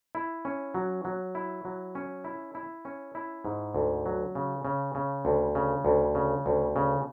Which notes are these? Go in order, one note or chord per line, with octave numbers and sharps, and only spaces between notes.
E4
C#4
F#3
F#3
E4
F#3
C#4
E4
E4
C#4
E4
G#2
D2
F#3
C#3
C#3
C#3
D2
C#3
D2
C#3
D2
C#3